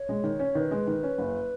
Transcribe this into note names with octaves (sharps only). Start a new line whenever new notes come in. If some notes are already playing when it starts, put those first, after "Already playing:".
Already playing: C#5
G#3
D#3
C#4
D#3 B4
G#3
D#3
C#4
F#1